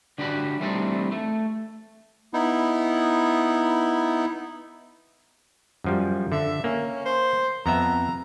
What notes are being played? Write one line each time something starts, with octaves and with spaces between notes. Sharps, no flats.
D3 D4 F#4 G4 B5
E3 G3 A3 C4 D4 D#4
A3
B3 D#4 E4
F#2 F3 G3
D3 E5
A#3 C#4
C5
F2 B3 E5 A#5